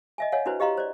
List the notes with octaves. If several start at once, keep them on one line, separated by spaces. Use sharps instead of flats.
D#5 E5 G#5
C#5 D#5 F5 F#5 G#5
D4 E4 F#4 B4 C5
G4 D#5 F5 A#5 C6
C5 D5